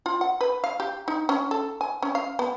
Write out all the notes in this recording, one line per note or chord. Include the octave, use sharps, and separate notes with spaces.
F4
F#5
B4
F5
G4
D#4
C#4
A4
G#5
C#4
F5
B3